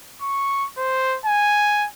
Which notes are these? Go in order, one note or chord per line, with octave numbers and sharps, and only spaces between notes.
C#6
C5
G#5